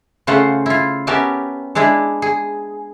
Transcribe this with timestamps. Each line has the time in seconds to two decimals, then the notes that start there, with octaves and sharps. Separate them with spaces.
0.27 C#3 A3 F4 C5 F#5
0.66 E4 F4
1.07 B3 C#4 G4 A#4 E5 A5
1.75 G#3 D4 E4 G#4
2.22 G#4